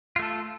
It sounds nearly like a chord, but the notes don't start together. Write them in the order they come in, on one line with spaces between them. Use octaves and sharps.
F4 A3 A4